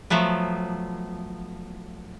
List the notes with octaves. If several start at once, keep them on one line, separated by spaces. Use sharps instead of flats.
F3 F#3 A3 B3